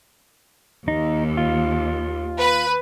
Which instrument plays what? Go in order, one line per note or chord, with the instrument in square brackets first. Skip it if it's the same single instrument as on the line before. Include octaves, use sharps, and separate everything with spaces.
[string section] D#2 [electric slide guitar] D#4
[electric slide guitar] F4
[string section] B4